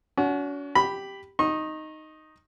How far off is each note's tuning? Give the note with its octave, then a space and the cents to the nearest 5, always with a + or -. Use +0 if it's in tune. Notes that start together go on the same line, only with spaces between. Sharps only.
C#4 +45 F#4 +0
G4 +0 B5 +0
D#4 +0 C#6 -35